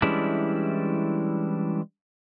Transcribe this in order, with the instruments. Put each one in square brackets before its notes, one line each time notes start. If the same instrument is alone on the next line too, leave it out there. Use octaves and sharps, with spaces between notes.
[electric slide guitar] E3 G3 G#3 C#4 D4 E4